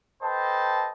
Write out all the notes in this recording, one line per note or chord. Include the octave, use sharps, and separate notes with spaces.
A4 B4 C5 D#5 G5 A5